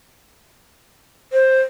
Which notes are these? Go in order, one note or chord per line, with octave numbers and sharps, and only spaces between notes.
C5